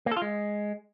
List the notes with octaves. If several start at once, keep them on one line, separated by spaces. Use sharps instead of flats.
A#3
A4
F4
G#3